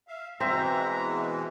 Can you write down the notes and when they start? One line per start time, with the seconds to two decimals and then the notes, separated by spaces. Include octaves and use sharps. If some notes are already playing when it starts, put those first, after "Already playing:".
0.08 E5 F5
0.40 B2 E3 G#3 C4 C5 E5 A#5